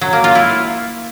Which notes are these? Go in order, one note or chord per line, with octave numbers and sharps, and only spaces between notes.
F#3
A#3
F4
E4